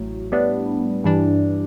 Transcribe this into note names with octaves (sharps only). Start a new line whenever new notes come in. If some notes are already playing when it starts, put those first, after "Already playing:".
Already playing: A1 A2 F#3
A2 G3 B3 D4
G2 E3 G3 D4